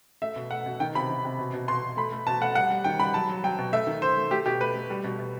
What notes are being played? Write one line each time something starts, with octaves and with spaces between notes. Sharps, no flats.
A3 E5
B2
A3 F#5
B2
D#3 G5
C3 B5
D#3
C3
B2
B2
B2 C6
B2
A3 B5
A3
B2 A5
A3 F#5
G3 F#5
G3
D#3 G5
G3 B5
F#3 A5
F#3
F#3 G5
B2
A3 E5
D#3
A3 C5
A3
A3 G4
B2 G4
A3 B4
A3
G3
B2
B2